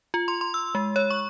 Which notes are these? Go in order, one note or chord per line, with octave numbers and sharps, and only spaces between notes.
F4
C6
C6
E6
G#3
C#5
C#6